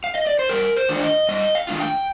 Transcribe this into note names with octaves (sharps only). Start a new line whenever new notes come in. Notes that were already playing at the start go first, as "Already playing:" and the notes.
F5
D#5
D5
C5
G2 A#4
C5
D#3 A3 D4 F4
D5
D#5
G2 D#5
F5
D#3 A3 D4 F4
G5